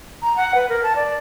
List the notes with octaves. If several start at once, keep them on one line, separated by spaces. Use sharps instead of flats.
A#5
F#5
B4
A#4
A5
D5